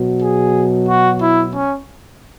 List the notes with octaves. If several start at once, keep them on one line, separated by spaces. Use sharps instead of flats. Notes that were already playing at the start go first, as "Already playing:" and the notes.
Already playing: B2 F#3
G#4
F#4
E4
C#4